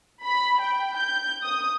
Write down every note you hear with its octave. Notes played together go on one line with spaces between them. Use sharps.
B5
G5
G6
D#6